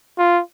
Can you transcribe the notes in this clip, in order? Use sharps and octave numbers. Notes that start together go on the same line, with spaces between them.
F4